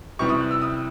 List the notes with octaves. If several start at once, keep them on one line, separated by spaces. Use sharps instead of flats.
C3 E3 G3 C#6
D#6
F#6
E6
D#6